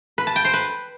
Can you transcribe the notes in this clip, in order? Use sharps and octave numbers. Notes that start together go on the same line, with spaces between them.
B4
A5
G5
C5
B4